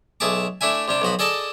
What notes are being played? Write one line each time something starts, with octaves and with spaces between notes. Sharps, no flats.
B1 G#4 E5 A5 D6
A3 D4 E4 E5 G#5
C3 G3 D4
B1 F3 F#4 B5
G#4 A4 D5 D#5 A5